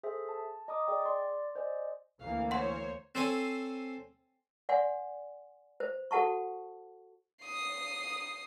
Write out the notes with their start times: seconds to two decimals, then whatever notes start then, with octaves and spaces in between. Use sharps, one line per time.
0.03 G#4 A4 C5 E5
0.29 A5
0.68 D#5 A#5 D6 D#6
0.88 G#4 D5 G5
1.05 D5 C6
1.56 C5 D5 D#5 G#5
2.20 D2 E3 A#3 F5
2.51 C5 C#5 F#5 C6
3.15 C4 A4 C5 C#5 G#5
4.69 D5 F#5 G#5 C6
5.80 C5
6.11 F#4 A4 F#5 A5 C#6
7.45 D#6 C7